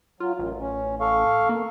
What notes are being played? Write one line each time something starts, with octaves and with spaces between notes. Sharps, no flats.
F#3 F4
A1 F#2
C#4
A4 F5 C#6
A#3